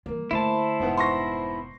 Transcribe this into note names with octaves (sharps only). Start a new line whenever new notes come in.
E3 G3 A#3
D3 A3 E4 C5 A5
F1 G#2 B3 F#5
C6 C#6 A#6